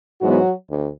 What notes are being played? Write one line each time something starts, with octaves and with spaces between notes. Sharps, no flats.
G#2 E3 F#3 G#3 B3 F#4
D2